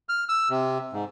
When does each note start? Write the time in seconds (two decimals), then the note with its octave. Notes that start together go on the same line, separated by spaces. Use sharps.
0.09 F6
0.29 E6
0.50 C3
0.93 G#2